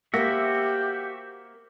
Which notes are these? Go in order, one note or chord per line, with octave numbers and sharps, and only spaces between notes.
A#3 F#4 G4 C5 E5